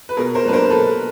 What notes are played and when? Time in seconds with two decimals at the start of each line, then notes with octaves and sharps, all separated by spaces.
0.09 B4
0.17 B2 G#4 A#4
0.35 A#4 C5
0.45 F#3 A#3 D4 B4
0.53 A#4 C5
0.70 B2 A4 B4